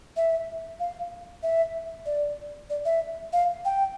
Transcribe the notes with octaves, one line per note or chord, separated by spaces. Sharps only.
E5
F5
E5
D5
D5
E5
F5
G5